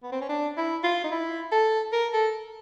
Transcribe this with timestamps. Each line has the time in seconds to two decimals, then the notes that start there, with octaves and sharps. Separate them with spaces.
0.03 B3
0.12 C4
0.21 C#4
0.29 D4
0.57 E4
0.83 F4
1.04 D#4
1.11 E4
1.52 A4
1.93 A#4
2.13 A4